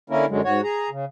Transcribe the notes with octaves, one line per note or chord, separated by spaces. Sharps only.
D3 A#3 C#4 E4 A#4
F#2 D3 F#3 G#3
G#2 F#4 C#5
G#4 A#5
C#3